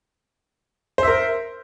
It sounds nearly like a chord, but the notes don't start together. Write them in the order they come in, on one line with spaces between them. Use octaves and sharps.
C5 E5 A#4